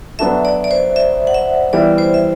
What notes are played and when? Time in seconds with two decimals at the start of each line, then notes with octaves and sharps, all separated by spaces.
0.19 F#3 B3 D4 F#4 A4 E5
0.45 D5
0.64 D5
0.71 C5
0.96 E5
1.27 F#5
1.34 E5
1.73 E3 G3 B3 E4 D5
1.98 C5
2.14 E5